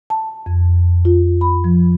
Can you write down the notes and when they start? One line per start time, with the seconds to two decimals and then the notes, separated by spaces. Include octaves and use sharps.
0.10 A5
0.46 F2
1.05 F4
1.41 B5
1.64 F3